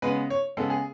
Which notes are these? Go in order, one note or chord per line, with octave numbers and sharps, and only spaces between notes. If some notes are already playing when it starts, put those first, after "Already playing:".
C#3 G#3 B3 B4
C#5
C#3 G#3 B3 A4
G#4